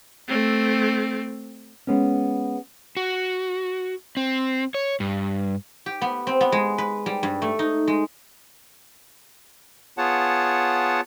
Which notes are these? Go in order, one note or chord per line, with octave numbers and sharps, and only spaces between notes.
A3 C4
G#3 B3 C#4
F#4
C4
C#5
G2
G4
B3
C4
B3
G#3
B4
G3
G2
A3
D#4
G#3
B3 F4 G#4 C#5 F#5 A5